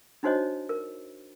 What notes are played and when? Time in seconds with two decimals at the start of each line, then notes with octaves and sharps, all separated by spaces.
0.23 D4 D#4 F#4 C5 C#5 D#5
0.69 A#4